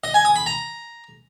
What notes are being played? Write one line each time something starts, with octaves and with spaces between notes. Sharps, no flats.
D#5
G#5
D#6
B5
A#5